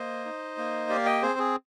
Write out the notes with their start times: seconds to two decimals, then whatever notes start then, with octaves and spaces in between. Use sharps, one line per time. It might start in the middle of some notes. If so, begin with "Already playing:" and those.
Already playing: A#3 C5 D#5
0.25 D#4
0.58 A#3
0.89 G4 D5 F5
1.06 D#5 G5
1.22 C4 G#4 C5
1.39 G#4